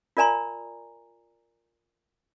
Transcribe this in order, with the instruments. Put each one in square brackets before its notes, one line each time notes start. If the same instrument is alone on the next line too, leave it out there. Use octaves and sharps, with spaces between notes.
[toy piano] F4 A#4 D5 G#5 A#5 C6